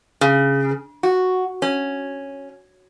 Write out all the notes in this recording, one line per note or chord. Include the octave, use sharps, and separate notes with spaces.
C#3
F#4
C#4